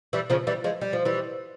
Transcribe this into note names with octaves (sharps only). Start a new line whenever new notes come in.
E3 G3
C#3 F3
E3 G3
F3 G#3
G3
F3
E3 G3